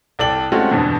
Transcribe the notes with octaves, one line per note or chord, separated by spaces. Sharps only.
C2 A4 D5 G5 F#7
G#3 A3 C4 C#4 F4 F#4
E2 G2 B2 D3 E3